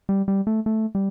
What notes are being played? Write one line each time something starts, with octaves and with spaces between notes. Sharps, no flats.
G3
G3
A3
A3
G3